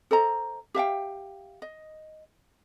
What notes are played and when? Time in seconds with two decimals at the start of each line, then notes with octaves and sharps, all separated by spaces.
0.11 A4 C5 D#5 A#5
0.74 G4 E5 F5 G5
1.62 D#5